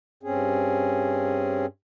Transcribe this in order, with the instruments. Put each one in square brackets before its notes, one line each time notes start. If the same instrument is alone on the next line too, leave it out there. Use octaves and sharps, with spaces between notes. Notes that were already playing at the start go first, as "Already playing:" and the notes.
[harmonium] G2 C4 C#4 G#4